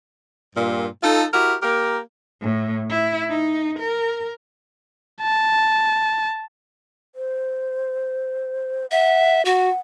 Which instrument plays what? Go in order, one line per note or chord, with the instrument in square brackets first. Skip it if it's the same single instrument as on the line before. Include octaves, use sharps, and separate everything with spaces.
[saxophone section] G2 A#2
D#4 F4 A4
E4 F#4 G4 A#4
A#3 G4 A#4
[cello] A2
E4
D#4
A#4
[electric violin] A5
[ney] C5
[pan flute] E5 [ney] F#5
[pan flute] F#4 [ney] F#5